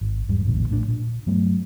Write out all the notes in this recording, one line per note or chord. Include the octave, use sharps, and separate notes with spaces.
G#1
E2 G#2 G3
E1 A1 A#2 D3
A#1 A2 D3 D4
A#2
G2 F#3 A3 B3